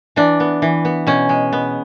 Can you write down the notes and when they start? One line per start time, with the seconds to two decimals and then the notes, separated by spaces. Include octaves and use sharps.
0.16 E3 D4
0.40 B3
0.62 E3
0.85 B3
1.07 B2 C#4
1.29 G#3
1.53 B3